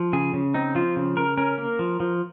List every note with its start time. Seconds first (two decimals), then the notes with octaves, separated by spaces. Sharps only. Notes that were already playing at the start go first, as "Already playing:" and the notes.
Already playing: F3
0.13 C#3 G#4
0.34 C#3
0.54 C4 D#4
0.75 F3 F4
0.96 C#3
1.17 C#3 A#4
1.38 C#4 A#4
1.58 A#3
1.79 F3
2.00 F3